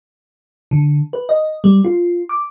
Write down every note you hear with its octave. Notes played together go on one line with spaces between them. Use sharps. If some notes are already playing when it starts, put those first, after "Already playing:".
D3
B4
D#5
G3
F4
D6